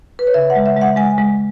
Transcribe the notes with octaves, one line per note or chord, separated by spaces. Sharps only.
B4
C#5
C#3 E5
F#5
G#3
E5
G#3
F#5
G#3 G#5
G#3